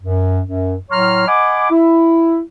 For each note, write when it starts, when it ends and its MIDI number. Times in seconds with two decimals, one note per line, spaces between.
0.03 0.40 42
0.47 0.75 42
0.91 1.26 45
0.91 1.26 54
0.91 1.26 73
0.91 1.26 82
0.91 1.26 84
0.91 1.26 89
1.27 1.67 75
1.27 1.67 78
1.27 1.67 80
1.27 1.67 83
1.27 1.67 86
1.71 2.39 64